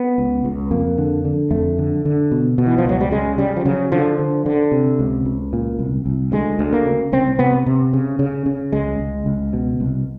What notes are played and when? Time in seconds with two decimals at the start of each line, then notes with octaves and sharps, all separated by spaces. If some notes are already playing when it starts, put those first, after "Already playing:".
Already playing: B3
0.18 C#2
0.45 C#2
0.71 F2 A#3
0.98 D3
1.25 D3
1.51 F2 A3
1.79 D3
2.05 D3
2.31 B2
2.58 B2
2.67 E3
2.78 F3
2.85 C#2 F#3
3.01 G3
3.11 C#3 G#3
3.38 C#3 G3
3.56 F3
3.65 C#3 F#3
3.92 D3 F3
4.19 D3
4.46 D3
4.72 C3
4.99 C#2
5.25 C#2
5.53 A#2
5.79 C2
6.06 C2
6.32 D2 G#3
6.59 D2
6.73 A#3
6.86 C#3
7.12 C2 C4
7.39 C3 B3
7.66 C3
7.93 C#3
8.19 C#3
8.46 C#3
8.73 C#2 G#3
9.00 C#2
9.26 C#2
9.53 B2
9.80 C2